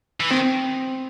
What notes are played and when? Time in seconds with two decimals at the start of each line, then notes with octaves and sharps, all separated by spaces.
0.20 E3
0.30 D#3 C4